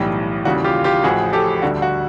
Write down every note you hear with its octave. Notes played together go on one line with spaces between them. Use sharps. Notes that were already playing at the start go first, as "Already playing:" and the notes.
Already playing: B1 A2 E3 G3
D#2 C#3 E3 G3 F#4
F4 G4
F4 G4
A1 A2 F3 F#4 G#4
G4 A4
D2 D3 G3 F#4
F#4